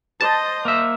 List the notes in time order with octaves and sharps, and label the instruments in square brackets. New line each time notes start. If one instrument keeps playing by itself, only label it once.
[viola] C5 D#5 [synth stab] A5
[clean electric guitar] A#3 E5